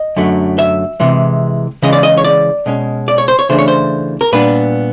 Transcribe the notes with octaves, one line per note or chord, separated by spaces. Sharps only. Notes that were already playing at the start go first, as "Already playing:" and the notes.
Already playing: D#5
F#2 D3 F#3 A3
E5
C3 E3 G#3
C#3 E3 G#3 C#4 D#5
D5
D#5
C#5
D5
B2 G#3 C#4
D5
C#5
C5
C#5
C#3 E3 A3 D4 C5
C#5
C5
A#4
A#2 G3 B3 D4 B4